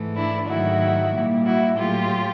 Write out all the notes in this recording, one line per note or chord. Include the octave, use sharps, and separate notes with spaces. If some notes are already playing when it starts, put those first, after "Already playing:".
Already playing: G#2 E3 A3
D4 E4
G#2 D#3 F#3 A3 E4 F#4
A#2 G3 A#3
E4 F#4
A2 F#3 A3 F4 G4